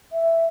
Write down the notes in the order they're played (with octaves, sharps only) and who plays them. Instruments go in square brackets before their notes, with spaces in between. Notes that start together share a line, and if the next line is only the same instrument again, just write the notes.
[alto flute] E5